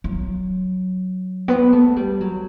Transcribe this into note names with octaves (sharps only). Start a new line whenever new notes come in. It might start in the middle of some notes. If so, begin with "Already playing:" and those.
F#3
B3
A3
G3
F#3